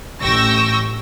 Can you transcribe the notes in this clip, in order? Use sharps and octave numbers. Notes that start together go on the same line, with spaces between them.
A1 G5 C#6 E6 A#6